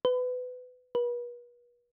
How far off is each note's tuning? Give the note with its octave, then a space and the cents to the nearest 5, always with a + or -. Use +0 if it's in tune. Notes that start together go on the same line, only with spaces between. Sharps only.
B4 +25
B4 -40